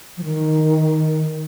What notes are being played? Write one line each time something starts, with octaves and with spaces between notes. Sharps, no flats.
F3
D#3